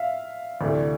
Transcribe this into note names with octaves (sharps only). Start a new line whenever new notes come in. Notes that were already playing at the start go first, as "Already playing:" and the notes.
Already playing: E5 F5
D2 C3 E3 A3 D5